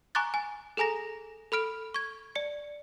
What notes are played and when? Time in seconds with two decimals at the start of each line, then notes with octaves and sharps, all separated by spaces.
0.15 G#5 A#5 C#6 D6 F#6 A6
0.34 G#5
0.77 G#4 A4 G#5 A#5 A#6
1.52 A4 B5 F6 D7
1.94 C#6 G#6
2.35 D5 C#7